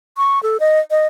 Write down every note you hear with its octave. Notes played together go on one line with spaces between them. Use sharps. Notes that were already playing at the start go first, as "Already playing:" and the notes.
C#6
A4
D#5
D#5